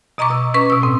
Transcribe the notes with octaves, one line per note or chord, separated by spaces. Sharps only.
B2 D#5 A#5 C#6 D6
B2 E6
C#4 B4 C#6
B2 E6
A2 C4